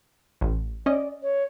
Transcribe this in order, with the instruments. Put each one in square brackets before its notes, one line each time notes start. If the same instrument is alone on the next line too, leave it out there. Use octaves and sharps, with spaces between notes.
[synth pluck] A1
[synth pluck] C#4 D#5 [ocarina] D5
[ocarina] C#5